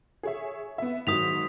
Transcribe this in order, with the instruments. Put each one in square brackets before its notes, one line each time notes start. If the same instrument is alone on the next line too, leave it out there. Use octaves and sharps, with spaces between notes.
[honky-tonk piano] G#4 C#5 E5
B3 E5
[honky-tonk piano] G#2 D#3 F#3 [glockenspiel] D#6 B6 F7